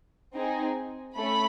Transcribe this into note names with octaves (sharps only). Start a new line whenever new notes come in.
C4 D#4 G#4
A3 C#4 B5